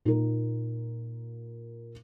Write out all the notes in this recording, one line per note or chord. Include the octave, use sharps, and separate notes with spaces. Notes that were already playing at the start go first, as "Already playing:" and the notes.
A#2 A#3 D#4 A#4